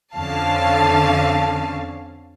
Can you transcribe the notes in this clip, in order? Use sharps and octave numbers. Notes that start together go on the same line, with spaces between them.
F2 D3 C#4 F5 A5